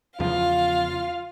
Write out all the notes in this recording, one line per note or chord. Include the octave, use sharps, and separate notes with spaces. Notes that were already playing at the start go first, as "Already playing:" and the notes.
E2 C#3 F3 F4 F5